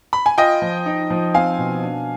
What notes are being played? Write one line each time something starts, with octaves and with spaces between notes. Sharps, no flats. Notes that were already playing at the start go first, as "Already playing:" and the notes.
B5
G#5
F4 D#5 G5
F3
D#4
F3
C4 F5 G#5
B2
D4